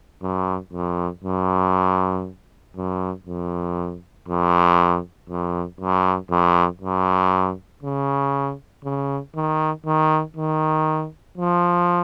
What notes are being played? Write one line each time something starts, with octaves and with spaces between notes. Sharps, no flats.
F#2
F2
F#2
F#2
F2
F2
F2
F#2
F2
F#2
C#3
C#3
D#3
D#3
D#3
F3